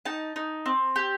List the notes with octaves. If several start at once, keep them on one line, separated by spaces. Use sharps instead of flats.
D#4 A5
D#4
C4
G4